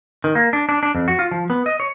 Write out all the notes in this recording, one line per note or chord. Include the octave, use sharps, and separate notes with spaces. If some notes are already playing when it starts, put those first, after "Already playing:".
D#3
A#3
D4
D4
D4
F2
F#4
F4
F3
B3
D#5
C#5